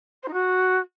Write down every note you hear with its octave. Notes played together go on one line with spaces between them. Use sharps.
C5
D#4
F#4